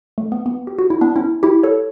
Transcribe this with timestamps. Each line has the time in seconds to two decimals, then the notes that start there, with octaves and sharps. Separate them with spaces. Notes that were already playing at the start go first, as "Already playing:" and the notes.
0.18 A3
0.32 B3
0.46 B3
0.67 G4
0.79 F#4
0.90 E4
1.01 B3 D4
1.16 C#4 E4
1.43 E4 G4
1.63 A4 C#5